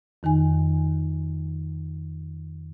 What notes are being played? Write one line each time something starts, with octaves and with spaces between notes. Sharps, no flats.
F2 D#3 D#4 G#5